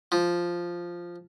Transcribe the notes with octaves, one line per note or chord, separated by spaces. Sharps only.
F3